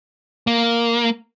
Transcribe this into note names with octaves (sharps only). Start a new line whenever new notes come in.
A#3